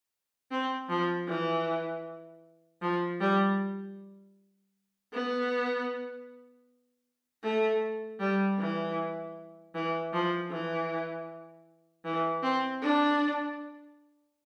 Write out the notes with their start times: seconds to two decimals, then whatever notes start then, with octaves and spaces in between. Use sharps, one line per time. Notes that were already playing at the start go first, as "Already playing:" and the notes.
0.51 C4
0.89 F3
1.28 E3
2.82 F3
3.20 G3
5.13 B3
7.43 A3
8.20 G3
8.59 E3
9.75 E3
10.13 F3
10.51 E3
12.05 E3
12.43 C4
12.83 D4